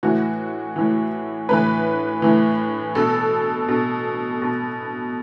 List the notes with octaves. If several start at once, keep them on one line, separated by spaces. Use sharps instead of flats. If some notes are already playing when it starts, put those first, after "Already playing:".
A2 E3 F#4
A2 E3
A2 E3 B4
A2 E3
B2 A4
B2
B2